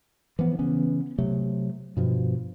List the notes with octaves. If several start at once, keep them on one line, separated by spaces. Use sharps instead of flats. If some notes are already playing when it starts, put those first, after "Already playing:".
E3 F3 B3
C#3 E3 B3 C#4
C3 F#3 A3
G2 B2 F3